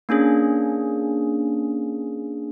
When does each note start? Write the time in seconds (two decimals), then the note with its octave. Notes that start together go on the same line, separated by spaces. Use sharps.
0.09 A#3 C#4 D4 G#4